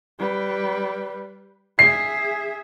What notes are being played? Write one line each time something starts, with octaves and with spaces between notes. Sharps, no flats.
G3 B4
G#4 E5 C7